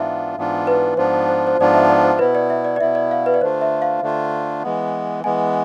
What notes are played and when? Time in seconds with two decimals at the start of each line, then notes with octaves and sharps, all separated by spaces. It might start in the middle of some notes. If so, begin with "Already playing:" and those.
Already playing: G#2 E3 B3 D4 F4 E5 F5
0.37 G#2 E3 B3 D4 F4
0.67 B4
0.97 G#2 F3 B3 D4 F4 C5
1.29 C5
1.47 C5
1.59 G#2 F3 B3 D4 F4 D5
1.74 E5
1.90 D5
2.04 C5
2.19 B2 B3 E4 B4
2.35 D5
2.50 E5
2.64 D5
2.76 D5
2.81 B2 B3 E4 E5
2.95 D5
3.11 F5
3.26 B4
3.34 D5
3.41 D3 A3 D4 F4 C5
3.61 E5
3.82 F5
4.02 D3 A3 D4 F4
4.63 E3 G#3 B3
5.24 E3 G#3 B3 G#5